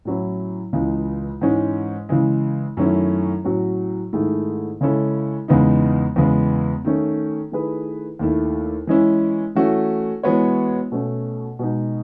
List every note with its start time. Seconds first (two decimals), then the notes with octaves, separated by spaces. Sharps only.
0.05 A2 F#3 C#4 E4
0.73 C#2 C#3 E3 G#3
1.41 G#2 E3 G#3 C#4
2.09 C#3 E3 G#3
2.77 F#2 D#3 A3 C#4 E4
3.44 A2 F#3 C#4 F#4
4.13 G#2 D#3 A3 E4 G#4
4.81 C#3 G#3 C#4 E4 A4
5.48 E2 C#3 G#3 B3 D#4
6.16 E2 C#3 G#3 B3
6.85 D#3 A3 C#4
7.52 D#3 A3 E4 G#4 B4
8.19 D#2 D#3 A3 E4
8.87 E3 G#3 C#4 E4
9.55 E3 A3 C#4 F#4
10.23 E3 G#3 B3 F#4 C#5
10.92 B2 A3 C#4
11.59 B2 G#3 D#4